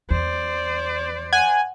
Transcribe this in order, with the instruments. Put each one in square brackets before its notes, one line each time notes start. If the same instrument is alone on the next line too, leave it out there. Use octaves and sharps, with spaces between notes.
[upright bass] E2 [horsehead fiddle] C5 D5
[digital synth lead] F#5 [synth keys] G#5